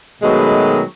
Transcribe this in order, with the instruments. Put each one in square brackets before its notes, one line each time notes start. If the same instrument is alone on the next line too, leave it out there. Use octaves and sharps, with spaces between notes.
[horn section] B2 D#3 F#3 G#3 A3 B4